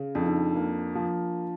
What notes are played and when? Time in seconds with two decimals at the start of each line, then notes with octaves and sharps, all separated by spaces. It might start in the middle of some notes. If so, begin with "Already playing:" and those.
Already playing: C#3
0.15 F2 D4
0.26 D#4
0.37 D4
0.55 A#3
0.95 F3